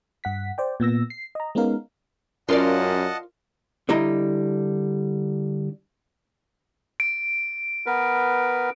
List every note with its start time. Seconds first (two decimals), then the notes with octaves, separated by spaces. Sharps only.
0.24 G2 F#5 B6
0.58 C5 D5 G5
0.80 A#2 B3 E6 A#6
1.10 C7
1.35 D#5 A#5
1.55 G#3 B3 C#4 D#4 A#4 F5
2.49 F#2 C#4 F4 A#4 D5 D#5 F#5 A5
3.89 D3 G3 E4 D#5 A#5
7.00 D7
7.86 B3 A#4 B4